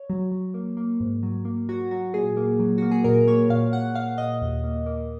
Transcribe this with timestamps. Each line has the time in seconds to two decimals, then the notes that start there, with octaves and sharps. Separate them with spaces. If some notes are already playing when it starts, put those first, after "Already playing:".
Already playing: C#5
0.10 F#3
0.32 F#3
0.54 A#3
0.77 A#3
1.00 G#2
1.23 F#3
1.45 A#3
1.69 F#3 F#4
1.91 F#3 F#4
2.14 A#2 G#4
2.37 A#3
2.60 F#3
2.78 A#3 F#4
2.91 G#4
3.04 A#2 A#4
3.27 A#3 C#5
3.50 A#2 F5
3.73 A#2 F#5
3.95 A#2 F5
4.18 A#2 D#5
4.42 D#2
4.64 A#3
4.86 A#3